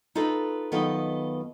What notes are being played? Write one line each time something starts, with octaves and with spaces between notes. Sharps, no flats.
D#4 F4 A4 B4
F#2 D#3 B3 F4 A4 D#5